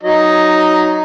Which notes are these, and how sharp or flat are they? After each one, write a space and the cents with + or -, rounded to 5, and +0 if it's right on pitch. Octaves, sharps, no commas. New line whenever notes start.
F#3 +0 D#4 +0 D#5 +0